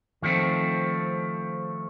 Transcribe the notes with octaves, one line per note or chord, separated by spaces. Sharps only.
D#3 F3 A3 C4